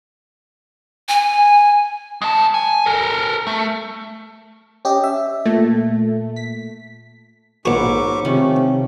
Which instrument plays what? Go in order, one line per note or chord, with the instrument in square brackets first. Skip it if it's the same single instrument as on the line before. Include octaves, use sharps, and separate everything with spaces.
[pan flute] G#5
[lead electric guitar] G#3 A5
G#5
A4 A#4
A3
[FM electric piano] C#4 G4 D#5
E5
[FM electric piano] A#2 [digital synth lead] A3
[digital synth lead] B6
[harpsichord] A#1 F#4 [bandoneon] G#2 C#6 D6 [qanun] F#3 B4
[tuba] C3 [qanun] D#3 F3 C#4 [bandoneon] A3